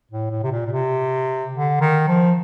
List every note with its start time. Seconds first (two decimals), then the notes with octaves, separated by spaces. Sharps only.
0.11 A2
0.31 A2
0.43 C3
0.52 A#2
0.66 A#2
0.72 C3
1.53 D3
1.80 D#3
2.07 F3